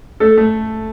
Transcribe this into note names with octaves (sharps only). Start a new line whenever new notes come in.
A3 A4
A3